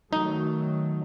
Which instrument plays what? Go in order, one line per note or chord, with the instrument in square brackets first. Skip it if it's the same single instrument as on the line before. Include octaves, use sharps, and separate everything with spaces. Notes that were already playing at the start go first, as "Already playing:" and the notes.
[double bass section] D#3 F#3 A3 [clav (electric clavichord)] D#4